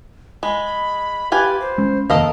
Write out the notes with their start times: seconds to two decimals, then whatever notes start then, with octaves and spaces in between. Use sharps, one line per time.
0.43 G#3 B5
1.32 F4 G4 B4 G#5
1.61 C5
1.78 G#3 C#4
2.10 F1 D#2 A4 A#4 D#5 F5